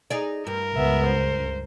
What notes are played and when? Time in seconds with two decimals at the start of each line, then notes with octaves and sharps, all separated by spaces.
0.10 D#4 G#4 D5
0.47 G2 A#4
0.76 C#2 B3 E5
1.05 C5